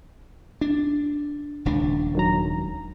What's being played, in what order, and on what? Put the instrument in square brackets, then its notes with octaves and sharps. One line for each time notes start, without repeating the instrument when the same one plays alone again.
[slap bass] D4
D#1 C#2 D4
[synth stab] D#3 F#3 A#5